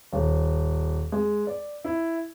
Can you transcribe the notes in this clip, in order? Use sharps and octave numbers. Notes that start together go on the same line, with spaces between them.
D#1
G#3
D5
E4